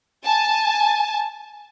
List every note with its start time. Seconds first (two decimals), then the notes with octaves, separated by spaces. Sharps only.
0.24 G#5 A5